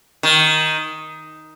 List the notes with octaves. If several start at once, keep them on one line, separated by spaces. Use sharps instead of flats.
D#3